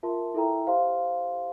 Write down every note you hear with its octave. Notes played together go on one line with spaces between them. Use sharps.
F4 A#4 E5 A5 C6
E4 A4 E5 G5 A#5
G4 C5 F5 C6